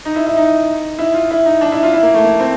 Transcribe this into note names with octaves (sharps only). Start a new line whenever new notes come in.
D#4
E4
E4
D#4
E4
F4
E4
D#4
D4
E4
F4
E4
A#3
A3
A#3
C4